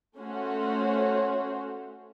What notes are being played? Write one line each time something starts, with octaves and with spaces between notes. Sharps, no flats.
A3 C#4 F#4 C5 C#5